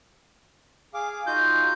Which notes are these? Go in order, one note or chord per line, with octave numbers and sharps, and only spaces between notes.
G#4 F5 D6
D#4 F4 F#4 G6